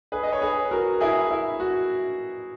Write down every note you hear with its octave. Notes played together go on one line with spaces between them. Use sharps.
G#4 B4
D#5
C#5
G#4 B4
F#4 A#4
E4 G#4
E4
F#4